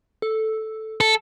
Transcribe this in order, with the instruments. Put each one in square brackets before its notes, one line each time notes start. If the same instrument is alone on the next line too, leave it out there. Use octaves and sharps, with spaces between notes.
[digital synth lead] A4
[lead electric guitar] A4